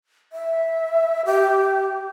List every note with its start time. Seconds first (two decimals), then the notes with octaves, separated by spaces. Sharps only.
0.32 E5
1.25 G4